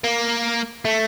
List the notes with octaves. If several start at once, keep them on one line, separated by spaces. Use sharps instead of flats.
A#3
A3